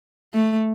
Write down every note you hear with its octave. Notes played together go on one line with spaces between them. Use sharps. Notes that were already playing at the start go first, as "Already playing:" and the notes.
A3